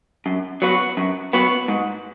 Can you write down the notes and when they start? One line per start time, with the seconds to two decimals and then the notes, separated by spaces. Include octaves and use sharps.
0.26 F#2
0.62 F#3 B3 F#4
0.97 F#2
1.33 F#3 B3 F#4
1.68 G#2